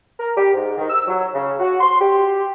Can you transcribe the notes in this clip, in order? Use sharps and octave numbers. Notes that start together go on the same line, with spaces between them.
A#4
G4
G#2
D#3
E6
F#3
C#3
F#4
C6
G4